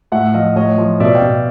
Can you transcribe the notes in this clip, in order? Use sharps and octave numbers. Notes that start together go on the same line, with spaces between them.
A2 E5 F#5
F3 D#5 F5
A2 C#5 D#5
F3
B2 D5 E5
F5 G5
B2